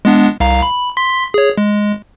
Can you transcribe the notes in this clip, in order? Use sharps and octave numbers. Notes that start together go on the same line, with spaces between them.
G#3 B3 D4
C2 F5 A#5
B5
C6 B6
G#4 C#5
G#3